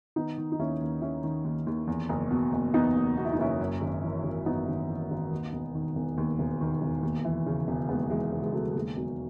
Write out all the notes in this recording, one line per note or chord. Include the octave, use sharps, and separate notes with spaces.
D#3 B3 D#4
D#3
D#4
D#2 C#4 E4
D#2
D#3 C#4 E4
D#3
D#2
D#2
E2
F#1
B2
F#1
E2 B3 D#4
F#1
B2 F#4
E4
D#4
F#1 C#4 E4
F#2
G#1
E3
G#1
F#2 B3 D#4
G#1
E3
G#1
D#2
E1
D#3
E1
D#2
E1
D#3
E1
D#2
E3
C#3
E1
D#2 G#3 B3
E3 G#3
C#3
G#3
E1 F#3 A3
A3
D#2 G#3
E1 F#3